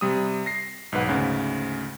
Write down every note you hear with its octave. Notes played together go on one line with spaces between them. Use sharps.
C3 G3 D#6
A#6 C7
B1 G#2 B4 F#5
D2 G#2 C#3